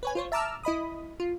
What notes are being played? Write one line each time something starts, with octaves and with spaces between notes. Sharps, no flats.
B4 C#5 G#5
F4 C5 C#5
E5 A5 A#5 D6 E6 F6
E4 D#5 B5 D#6
F4